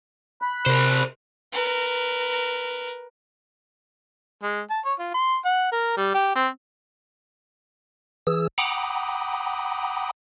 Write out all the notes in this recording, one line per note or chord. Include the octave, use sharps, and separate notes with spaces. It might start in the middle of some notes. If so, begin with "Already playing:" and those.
B5 F#6
C3 A#4 C5
A#4 B4
G#3
A5
C#5
F4
C6
F#5
A#4
G3
G4
C4
E3 G#4 E6
F#5 G5 A#5 B5 D6 D#6